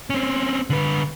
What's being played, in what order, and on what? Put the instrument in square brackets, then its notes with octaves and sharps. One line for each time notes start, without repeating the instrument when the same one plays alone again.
[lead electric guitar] C4 C#4
D3 B4